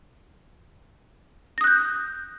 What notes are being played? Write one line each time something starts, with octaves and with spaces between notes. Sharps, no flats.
D#6 F#6 G6 A#6